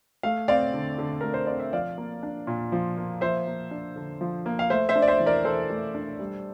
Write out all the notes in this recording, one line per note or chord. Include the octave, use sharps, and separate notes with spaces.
A3 F5
C4 D5 F5
D3
D3
A3 A#4
C5
C4 D5
E5
F3 D5 F5
A#3
D4
A#2
F3
A#3
F3 C5 E5
A#3
D4
D3
F3
A#3
F5
A3 C5 E5
C5 E5
D4
D5
C5 E5
E3
A#4 D5
E3 A4 C5
A3
D4
G3